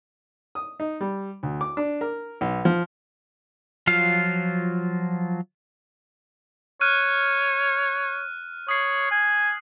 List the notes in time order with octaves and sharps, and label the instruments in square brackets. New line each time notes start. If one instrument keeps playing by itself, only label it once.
[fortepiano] D#6
D#4
G3
D2
D6
D4
A#4
B1
F3
[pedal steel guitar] F3 F#3 F4 F5
[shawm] C#5 [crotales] F6 F#6 D#7
[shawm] C#5 [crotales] D#6 C7
[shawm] G#5